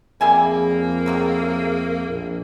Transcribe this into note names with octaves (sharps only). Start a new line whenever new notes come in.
F2 G3 A#3 G#4 E5 G#5
D#3 F#3 A3
A#1